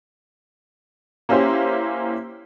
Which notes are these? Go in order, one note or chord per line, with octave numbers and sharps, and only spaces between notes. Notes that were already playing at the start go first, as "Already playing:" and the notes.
A#3 C#4 E4 G4 C5